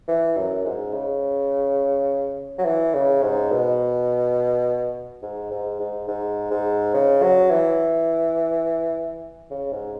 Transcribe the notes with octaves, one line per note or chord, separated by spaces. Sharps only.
E3
F#2
G#2
C#3
F#3
E3
C#3
G#2
B2
G#2
G#2
G#2
G#2
G#2
C#3
F#3
E3
C#3
G#2